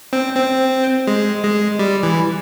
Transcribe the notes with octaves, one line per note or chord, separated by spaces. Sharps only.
C4
C4
G#3
G#3
G3
E3